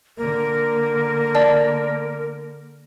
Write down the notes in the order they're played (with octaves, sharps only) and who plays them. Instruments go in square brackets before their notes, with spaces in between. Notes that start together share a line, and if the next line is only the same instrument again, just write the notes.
[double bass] D3 A#3 [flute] A#4
[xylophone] D5 A5